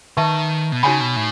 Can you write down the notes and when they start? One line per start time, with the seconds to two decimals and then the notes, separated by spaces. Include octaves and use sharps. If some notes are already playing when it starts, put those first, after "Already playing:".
0.17 D#3 B4 E5 A5 C#6
0.72 B2
0.83 C#3 D#4 F#4 C#5 G#5 B5
1.00 B2
1.16 A2